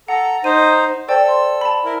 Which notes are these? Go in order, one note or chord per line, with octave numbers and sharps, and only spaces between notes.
A4 F#5 A#5
D#4 C5 D#7
A4 C5 D5 G5 E6
C6
A5 B5
E4 A#4